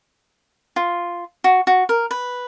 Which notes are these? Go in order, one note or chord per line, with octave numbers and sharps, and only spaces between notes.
F4
F#4
F#4
A#4
B4